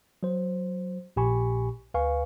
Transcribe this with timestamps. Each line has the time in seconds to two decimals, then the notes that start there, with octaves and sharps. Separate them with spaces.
0.23 F#3 C5
1.16 A#1 A#2 G4 G#5 B5 C#6
1.94 D2 B4 F5 G#5 C#6